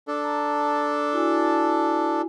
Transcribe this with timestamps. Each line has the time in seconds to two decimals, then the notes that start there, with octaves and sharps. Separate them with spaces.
0.08 D4 A4
0.24 A#5
1.13 E4 F#4 G#5